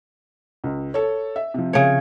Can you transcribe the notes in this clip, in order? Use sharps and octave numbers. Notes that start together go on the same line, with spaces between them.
C#2
A4 C#5
E5
C3 F3
C#3 C#5